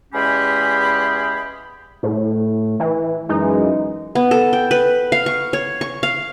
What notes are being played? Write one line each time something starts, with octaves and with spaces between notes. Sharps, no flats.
E2 G#3 C#4 G4 G#4 B5
A2
E3
F#2 E3 G#3 D#4
B3
A4
G5
B4
F5
C#6
C#5
C#6
F5